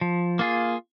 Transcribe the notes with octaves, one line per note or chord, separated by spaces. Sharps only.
F3
A#3 F4 G#4